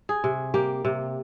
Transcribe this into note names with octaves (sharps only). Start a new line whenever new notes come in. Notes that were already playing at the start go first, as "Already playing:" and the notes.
G#4
C3
A#3 G4
C3